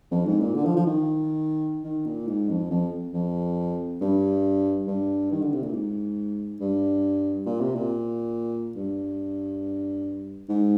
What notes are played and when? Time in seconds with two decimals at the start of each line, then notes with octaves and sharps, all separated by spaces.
0.11 F2
0.25 G#2
0.40 A#2
0.54 D3
0.65 F3
0.76 F3
0.87 D#3
1.84 D#3
2.06 A#2
2.27 G#2
2.49 F2
2.71 F2
3.13 F2
4.01 G2
4.87 G2
5.32 D#3
5.42 D3
5.53 C3
5.63 A#2
5.73 G#2
6.60 G2
7.46 A#2
7.61 C3
7.75 A#2
8.76 G2
10.49 G#2